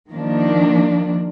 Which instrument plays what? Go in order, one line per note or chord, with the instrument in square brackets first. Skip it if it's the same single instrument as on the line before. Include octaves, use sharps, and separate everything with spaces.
[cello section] D#3 F3 A#3 D4